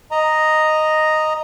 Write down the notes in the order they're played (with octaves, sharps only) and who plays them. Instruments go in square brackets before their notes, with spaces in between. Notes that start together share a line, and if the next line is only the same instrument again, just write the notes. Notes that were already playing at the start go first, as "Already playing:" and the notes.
[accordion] D#5 A#5